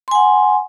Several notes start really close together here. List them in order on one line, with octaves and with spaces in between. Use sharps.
C6 G#5 F#5